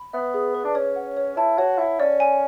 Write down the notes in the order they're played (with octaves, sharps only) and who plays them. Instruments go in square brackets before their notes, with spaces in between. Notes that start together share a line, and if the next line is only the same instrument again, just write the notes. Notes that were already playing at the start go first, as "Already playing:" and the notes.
Already playing: [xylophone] B5
[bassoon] B3 [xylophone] E5
[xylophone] G#4
B4
[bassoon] D4
[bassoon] C#4 [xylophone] C#5
[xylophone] F#5
C#5
[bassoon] E4 [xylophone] A5
[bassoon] F#4 [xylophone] C#5
[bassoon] E4 [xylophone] F#5
[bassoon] C#4 [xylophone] D5
[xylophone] G#5